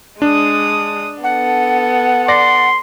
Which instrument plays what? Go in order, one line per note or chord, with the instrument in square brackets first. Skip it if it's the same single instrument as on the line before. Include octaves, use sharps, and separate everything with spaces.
[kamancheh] G#3 D#6 [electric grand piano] D4
[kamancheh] B3 A4 [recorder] F#5
[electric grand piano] D5 A#6 [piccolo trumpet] C6